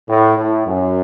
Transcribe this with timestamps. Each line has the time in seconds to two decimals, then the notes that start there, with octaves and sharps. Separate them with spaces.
0.09 A2
0.37 A2
0.66 F#2